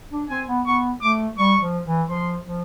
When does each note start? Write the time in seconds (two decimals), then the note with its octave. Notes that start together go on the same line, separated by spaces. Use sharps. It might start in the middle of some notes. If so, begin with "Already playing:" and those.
0.12 D4
0.29 C4 G#5
0.47 B3
0.65 B3 C#6
1.02 A3 D6
1.38 G3 C#6
1.61 F3
1.86 E3
2.09 F3 C6
2.46 F3